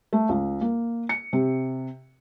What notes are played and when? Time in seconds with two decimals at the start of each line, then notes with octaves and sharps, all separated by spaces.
0.13 A3
0.29 C#2
0.61 A#3
1.09 C#7
1.33 C3